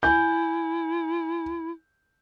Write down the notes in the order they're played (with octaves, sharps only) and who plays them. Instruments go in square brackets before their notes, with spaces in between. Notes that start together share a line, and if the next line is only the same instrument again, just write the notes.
[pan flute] E4 [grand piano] G#5 G6